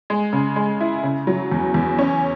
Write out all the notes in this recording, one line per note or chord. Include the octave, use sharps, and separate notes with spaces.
G#3
C#3
G#3
E4
C#3
F#3
E2
E2
C#4